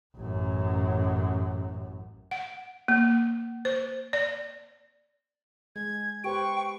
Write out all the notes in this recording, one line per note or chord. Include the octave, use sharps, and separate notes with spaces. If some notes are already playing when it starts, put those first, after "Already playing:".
A1 F#2
F#5
A#3
C5
D5
G#3 G#6
G4 B4 C5 G5 C#6